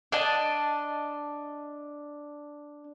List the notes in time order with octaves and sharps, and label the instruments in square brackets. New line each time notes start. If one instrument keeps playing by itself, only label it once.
[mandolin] D4 D#5 A5